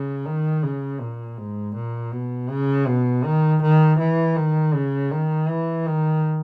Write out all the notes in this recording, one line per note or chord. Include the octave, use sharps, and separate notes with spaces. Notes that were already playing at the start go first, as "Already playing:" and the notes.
Already playing: C#3
D#3
C#3
A#2
G#2
A#2
B2
C#3
B2
D#3
D#3
E3
D#3
C#3
D#3
E3
D#3